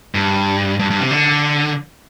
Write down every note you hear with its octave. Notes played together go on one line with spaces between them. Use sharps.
G2
G2
G2
C3
D3